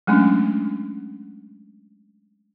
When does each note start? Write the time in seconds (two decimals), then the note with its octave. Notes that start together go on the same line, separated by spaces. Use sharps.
0.07 F#3 G#3 A3 C#4 D4